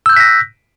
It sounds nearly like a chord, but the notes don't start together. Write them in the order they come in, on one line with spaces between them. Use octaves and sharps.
E6 G6 F#6 B6 A#6